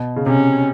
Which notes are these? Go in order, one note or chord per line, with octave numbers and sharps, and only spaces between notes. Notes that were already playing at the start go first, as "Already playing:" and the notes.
Already playing: B2
C#3
C3 C#4